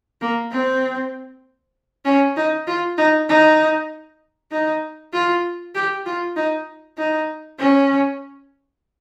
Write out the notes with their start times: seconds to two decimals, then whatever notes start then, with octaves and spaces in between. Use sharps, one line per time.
0.21 A#3
0.52 C4
2.06 C#4
2.36 D#4
2.67 F4
2.98 D#4
3.29 D#4
4.52 D#4
5.13 F4
5.75 G4
6.06 F4
6.37 D#4
6.98 D#4
7.59 C#4